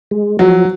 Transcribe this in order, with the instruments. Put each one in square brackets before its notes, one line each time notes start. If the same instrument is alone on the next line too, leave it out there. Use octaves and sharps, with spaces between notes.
[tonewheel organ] G#3
[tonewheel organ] F3 [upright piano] F#3